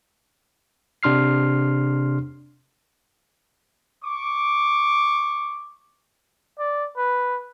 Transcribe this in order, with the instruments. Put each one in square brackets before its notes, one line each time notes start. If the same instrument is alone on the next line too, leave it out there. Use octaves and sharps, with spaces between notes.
[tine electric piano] C3 D4 C6 F6 C7
[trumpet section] C#6 D6
[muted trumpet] D5
B4